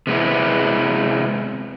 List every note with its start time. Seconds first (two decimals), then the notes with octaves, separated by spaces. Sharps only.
0.07 C3 G#3 B3 E4